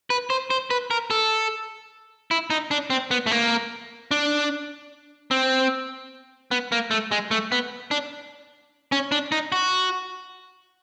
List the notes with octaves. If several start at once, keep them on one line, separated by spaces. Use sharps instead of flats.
B4
C5
C5
B4
A#4
A4
E4
D#4
D4
C4
B3
A3
A#3
D4
C4
B3
A#3
A3
G#3
A3
B3
D4
C#4
D4
D#4
F#4